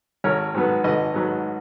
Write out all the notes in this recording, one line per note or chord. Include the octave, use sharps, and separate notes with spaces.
G#1 A#4 C#5
G#2 F#3 B3
G#1 B4 D#5
G#2 F#3 B3